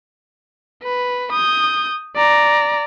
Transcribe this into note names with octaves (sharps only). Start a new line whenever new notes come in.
B4
D#6 G6
D5 A#5